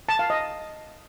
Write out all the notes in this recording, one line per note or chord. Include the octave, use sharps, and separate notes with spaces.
A5
F5
D#5